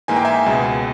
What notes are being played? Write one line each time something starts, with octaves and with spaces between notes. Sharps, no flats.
G#2 E3 A#3 D#4 G#5
G5
E5 G#5
C#2 B2 G#3